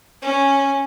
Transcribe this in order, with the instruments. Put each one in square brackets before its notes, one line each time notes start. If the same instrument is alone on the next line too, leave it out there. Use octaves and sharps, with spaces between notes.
[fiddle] C#4